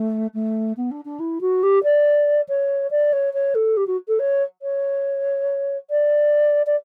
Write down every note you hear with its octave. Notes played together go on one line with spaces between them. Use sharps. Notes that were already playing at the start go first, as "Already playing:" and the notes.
Already playing: A3
A3
B3
D4
D4
E4
F#4
G4
D5
C#5
D5
C#5
C#5
A4
G4
F#4
A4
C#5
C#5
D5
D5